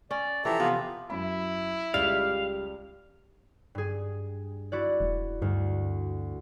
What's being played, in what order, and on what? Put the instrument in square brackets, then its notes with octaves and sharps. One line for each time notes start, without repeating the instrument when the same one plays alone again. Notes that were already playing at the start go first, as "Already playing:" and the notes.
[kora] C#4 [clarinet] D5
[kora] E3 F3 [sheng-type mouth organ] G4 A4 A#5 [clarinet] E5
[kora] C3 [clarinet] B3 [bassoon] F4
[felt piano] F#2 B5 [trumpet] E4
[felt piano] C#2 [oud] G3 [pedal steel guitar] F5
[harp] G2 G#4
E4 F#4 D5
[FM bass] E1
[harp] D2 [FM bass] G2